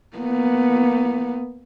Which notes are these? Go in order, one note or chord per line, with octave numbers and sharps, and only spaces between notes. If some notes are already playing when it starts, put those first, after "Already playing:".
A#3 B3